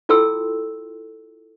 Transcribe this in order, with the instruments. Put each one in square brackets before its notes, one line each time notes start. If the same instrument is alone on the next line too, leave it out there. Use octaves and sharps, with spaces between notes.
[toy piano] E4 F4 A4 G5 C6 E6